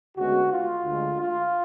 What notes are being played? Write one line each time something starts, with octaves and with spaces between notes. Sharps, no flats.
D2 C#3 G#3 B3 F#4
F4
D2 D3 G#3
F4